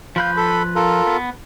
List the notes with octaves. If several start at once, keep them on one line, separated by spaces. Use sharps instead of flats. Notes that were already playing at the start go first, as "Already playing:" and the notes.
F3 B4 F5 G6
A4 B5
F4 A4 A#4
B3